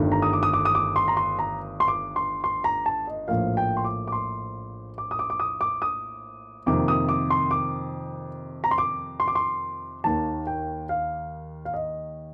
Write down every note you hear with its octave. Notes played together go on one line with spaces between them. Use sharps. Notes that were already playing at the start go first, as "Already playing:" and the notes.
Already playing: G1 G2 D#3 A3
A#5
D#6
D6
D#6
D6
D#6
D6
C6
A#5
C6
A#5
C6
D6
C6
C6
A#5
A5
D#5
A#1 A2 F3 A#3 F5
G5
C6
D6
D6
C6
D6
D#6
D6
D6
D#6
D6
D#6
F2 C3 D#3 A#3 D6
D#6
D6
C6
D6
A#5
C6
D6
C6
D6
C6
D#2 D#3 A#3 A5
G5
F5
F5
D#5